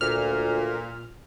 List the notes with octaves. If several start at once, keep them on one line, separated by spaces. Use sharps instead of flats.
D2 A#2 F6